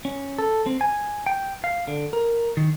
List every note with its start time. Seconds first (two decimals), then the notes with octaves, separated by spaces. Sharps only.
0.05 C#4
0.38 A4
0.66 C4
0.81 G#5
1.26 G5
1.64 F5
1.88 D3
2.13 A#4
2.57 D#3